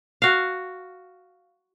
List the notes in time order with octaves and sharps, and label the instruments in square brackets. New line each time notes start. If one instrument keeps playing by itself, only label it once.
[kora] F#4 F5